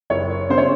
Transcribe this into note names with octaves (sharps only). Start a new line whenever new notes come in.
F#1 C#5
C#3 C5
C#5